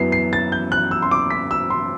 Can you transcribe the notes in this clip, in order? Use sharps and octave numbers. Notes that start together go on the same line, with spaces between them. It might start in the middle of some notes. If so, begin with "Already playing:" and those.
Already playing: F#2 F#3 B3 E4 C7
C7
A6
G6
F#6
E6
C6
D6
B6
E6
C6